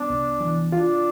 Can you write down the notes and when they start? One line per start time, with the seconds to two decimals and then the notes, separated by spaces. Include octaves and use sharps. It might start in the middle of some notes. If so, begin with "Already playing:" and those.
Already playing: B3 D4
0.10 C2
0.40 E3
0.72 D4 F4